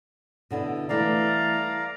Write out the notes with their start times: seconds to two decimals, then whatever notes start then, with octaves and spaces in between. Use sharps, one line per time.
0.51 B2 D3 E4
0.89 E3 G3 A3 D5 F5 A#5